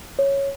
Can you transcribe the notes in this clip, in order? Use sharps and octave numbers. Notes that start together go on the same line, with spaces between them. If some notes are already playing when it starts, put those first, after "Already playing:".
C#5